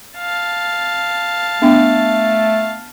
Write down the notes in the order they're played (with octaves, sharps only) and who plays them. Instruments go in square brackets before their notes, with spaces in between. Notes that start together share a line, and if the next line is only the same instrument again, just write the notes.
[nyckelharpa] F5 A5
[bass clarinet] A3 [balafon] B3 D4 G5